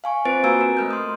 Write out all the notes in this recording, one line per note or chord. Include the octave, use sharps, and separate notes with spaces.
F5 G#5 C#6
C4 F4 B4 C5 A6 D7
A#3 F#4 G#5 A#5 E6 D7
A#4
A3 F6 G6
C6 D#6